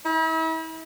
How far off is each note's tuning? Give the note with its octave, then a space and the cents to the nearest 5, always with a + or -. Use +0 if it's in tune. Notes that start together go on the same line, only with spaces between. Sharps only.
E4 -40